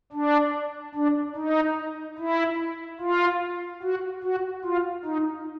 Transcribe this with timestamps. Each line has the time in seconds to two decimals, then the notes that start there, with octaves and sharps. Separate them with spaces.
0.13 D4
0.95 D4
1.36 D#4
2.18 E4
3.00 F4
3.82 F#4
4.23 F#4
4.64 F4
5.05 D#4